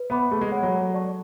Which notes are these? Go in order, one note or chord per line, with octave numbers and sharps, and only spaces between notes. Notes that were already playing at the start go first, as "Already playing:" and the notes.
Already playing: B4
B3 E5 B5 D6
A3 G#4
G#3
C#5 F#5 B5
F#3
A4
D5 A5 C#6